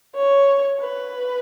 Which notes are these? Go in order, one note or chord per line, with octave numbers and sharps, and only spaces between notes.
C#5
B4